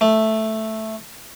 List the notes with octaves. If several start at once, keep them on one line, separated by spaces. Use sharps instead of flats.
A3